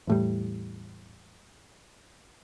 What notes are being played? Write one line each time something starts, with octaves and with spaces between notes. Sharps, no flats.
E2 A2 G3